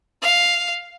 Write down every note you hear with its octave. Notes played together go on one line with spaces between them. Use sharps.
F5